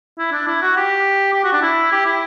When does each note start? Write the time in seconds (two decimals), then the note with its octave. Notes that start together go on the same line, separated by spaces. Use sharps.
0.19 E4
0.32 D4
0.48 E4
0.62 F#4
0.77 G4
1.33 G4
1.44 F#4
1.53 D4
1.62 E4
1.92 G4
2.06 E4